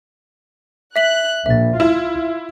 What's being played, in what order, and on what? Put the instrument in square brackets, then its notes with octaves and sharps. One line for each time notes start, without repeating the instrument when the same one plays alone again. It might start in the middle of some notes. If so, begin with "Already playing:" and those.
[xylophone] E5 B6 F#7 [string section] F#6
[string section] A#1 [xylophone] E5 A6
[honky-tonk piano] E4 [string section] F4 [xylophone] E7